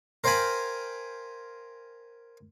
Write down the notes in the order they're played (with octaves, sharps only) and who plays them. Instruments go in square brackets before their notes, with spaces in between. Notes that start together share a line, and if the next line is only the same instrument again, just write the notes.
[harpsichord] A#4 C5 F5 G5 G#5 B5